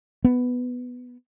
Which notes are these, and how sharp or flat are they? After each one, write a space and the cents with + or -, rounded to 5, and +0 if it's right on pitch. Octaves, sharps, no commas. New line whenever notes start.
B3 +5